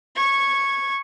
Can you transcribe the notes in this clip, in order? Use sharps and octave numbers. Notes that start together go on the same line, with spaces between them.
C#6 G#6